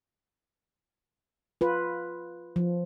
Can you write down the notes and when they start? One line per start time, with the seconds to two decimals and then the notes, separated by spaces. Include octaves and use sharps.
1.61 F4 B4
2.56 F3